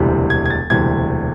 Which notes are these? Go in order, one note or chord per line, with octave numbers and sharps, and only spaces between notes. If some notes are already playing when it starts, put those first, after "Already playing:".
Already playing: E1 D2 C3 E3 G3
G#6
G#6
A6
E1 D2 C3 E3 G3 G#6